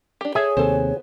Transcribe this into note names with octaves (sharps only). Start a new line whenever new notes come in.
D4 G4
G#4 A4 C#5 E5 G#5
D#2 C3 B3 A4 C5